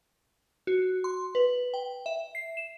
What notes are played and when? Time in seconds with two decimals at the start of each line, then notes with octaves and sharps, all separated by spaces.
0.67 F#4
1.04 C6
1.35 B4
1.74 G5
2.06 E5
2.35 C7
2.57 E7